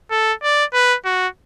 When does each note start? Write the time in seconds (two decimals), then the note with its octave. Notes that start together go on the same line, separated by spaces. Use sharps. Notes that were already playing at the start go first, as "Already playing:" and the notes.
0.11 A4
0.43 D5
0.73 B4
1.05 F#4